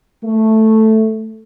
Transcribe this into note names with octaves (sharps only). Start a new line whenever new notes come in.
A3